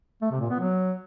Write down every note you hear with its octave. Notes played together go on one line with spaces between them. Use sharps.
A3
C3
A#2
B3
F#3